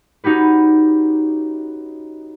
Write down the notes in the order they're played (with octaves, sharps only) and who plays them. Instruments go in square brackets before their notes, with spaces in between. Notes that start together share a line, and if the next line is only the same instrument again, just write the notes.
[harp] C#4 D#4 F#4 G4 B4